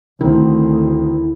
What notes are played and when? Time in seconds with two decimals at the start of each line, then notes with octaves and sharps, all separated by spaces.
0.21 D2 D#3 C4 E4